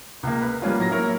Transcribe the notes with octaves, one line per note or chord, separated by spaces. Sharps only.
C#2 A#3
B4
G3 A#3 C#4 F4
A2 F#3 A#5 A#6
A#3 E4 A#4 C#5